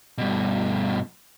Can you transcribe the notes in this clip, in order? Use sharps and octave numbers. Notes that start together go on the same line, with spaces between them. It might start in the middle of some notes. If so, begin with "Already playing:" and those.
G2 B2